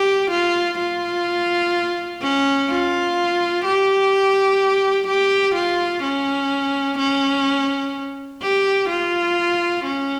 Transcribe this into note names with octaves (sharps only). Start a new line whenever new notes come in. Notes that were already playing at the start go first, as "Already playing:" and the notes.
Already playing: G4
F4
F4
C#4
F4
G4
G4
F4
C#4
C#4
G4
F4
C#4